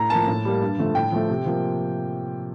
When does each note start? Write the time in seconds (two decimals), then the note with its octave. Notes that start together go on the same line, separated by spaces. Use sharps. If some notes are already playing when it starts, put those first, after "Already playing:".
Already playing: A2 A#5
0.10 F3 A#3 A5
0.28 A2
0.45 G3 A#3
0.61 G2
0.78 D3 F3 A3
0.95 A2 G5
1.12 F3 A3
1.30 C3
1.46 F3 A#3